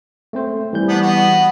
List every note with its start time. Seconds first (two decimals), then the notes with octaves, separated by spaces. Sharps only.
0.33 A3 C4 C5
0.73 E3 G3 G6
0.88 B3 D4
1.01 B3 F#4